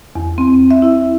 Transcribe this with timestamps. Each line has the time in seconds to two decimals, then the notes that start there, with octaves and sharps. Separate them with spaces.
0.15 E2
0.38 C4
0.71 E5
0.82 E4